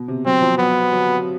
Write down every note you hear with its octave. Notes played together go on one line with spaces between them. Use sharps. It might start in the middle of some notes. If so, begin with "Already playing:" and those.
Already playing: B2
C3
F#3 C4
F3
F#3 B3
F#3